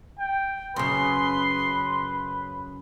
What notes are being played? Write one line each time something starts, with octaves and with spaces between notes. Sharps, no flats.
G5
F#2 C#3 B4 C6